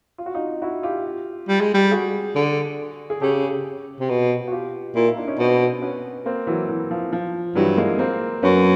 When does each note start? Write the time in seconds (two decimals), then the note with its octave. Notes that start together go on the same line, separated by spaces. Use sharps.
0.18 F4
0.26 F#4
0.34 D#4 F4
0.62 E4 F#4
0.83 F4 G4
1.48 G3
1.61 G#3
1.74 G3
1.91 F#4 G#4
2.35 D3
3.10 G#4
3.21 C#3 G4 A4
4.00 C3
4.09 B2
4.48 F#4
4.52 F4 G4
4.95 A#2 E4 F#4
5.06 D#4 F4
5.17 D4 E4
5.28 C#4 D#4
5.39 B2 C4 D4
5.82 B3 C#4
6.26 A#3 C4
6.47 E3 F#3
6.69 E3
6.91 F3
7.13 F3
7.55 G2 E3 F#3
7.77 G#3 A#3
7.99 A#3 C4
8.43 F#2 B3 C#4